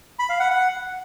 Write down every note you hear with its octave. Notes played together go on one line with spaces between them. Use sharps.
B5
F5
F#5
F#5